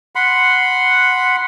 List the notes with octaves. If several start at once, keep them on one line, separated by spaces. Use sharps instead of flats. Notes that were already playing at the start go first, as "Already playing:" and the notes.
F#5 B5 C6